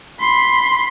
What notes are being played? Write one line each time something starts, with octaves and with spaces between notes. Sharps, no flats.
B5 C6